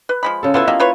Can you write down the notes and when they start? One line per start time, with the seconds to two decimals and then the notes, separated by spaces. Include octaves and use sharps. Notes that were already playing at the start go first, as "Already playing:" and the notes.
0.09 B4
0.23 F3 G#3 B5
0.43 C#3 A4
0.54 B3 E4 F4 A4 B4 E5
0.67 G3 A#3 D#5 E5
0.80 F4 B4 C#5